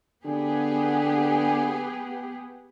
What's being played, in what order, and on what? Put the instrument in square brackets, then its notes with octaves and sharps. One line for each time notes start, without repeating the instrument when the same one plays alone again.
[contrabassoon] D3 [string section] B3 G4 G#4